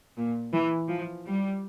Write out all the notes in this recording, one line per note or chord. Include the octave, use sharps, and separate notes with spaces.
A#2
E3
F3
G3